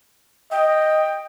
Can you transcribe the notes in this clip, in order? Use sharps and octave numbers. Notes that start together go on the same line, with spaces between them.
D#5 G5